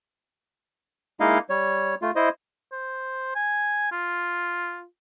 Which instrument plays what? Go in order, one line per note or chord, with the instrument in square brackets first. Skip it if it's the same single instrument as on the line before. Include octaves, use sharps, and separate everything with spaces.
[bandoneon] G#3 A#3 D#4 E4 D#5 F5
G3 C#5
A3 F4
E4 C5 D#5
[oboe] C5
G#5
F4